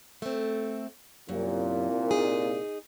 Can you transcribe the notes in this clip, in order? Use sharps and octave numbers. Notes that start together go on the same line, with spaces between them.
A3 C4
C2 F#2 A#2
D#4 G#4